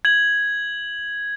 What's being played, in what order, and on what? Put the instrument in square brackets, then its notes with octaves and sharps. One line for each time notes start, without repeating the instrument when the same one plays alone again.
[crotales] G#6 F#7